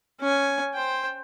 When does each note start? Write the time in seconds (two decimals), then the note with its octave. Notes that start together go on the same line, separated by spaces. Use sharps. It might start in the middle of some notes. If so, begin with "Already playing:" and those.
0.21 C#4 G#5
0.74 C5 G5